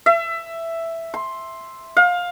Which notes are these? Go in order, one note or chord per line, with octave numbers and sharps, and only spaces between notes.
E5
C6
F5